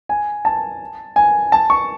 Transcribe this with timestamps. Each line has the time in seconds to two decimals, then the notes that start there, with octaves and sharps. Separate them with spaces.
0.09 G#5
0.45 A5
1.16 G#5
1.52 A5
1.70 C#6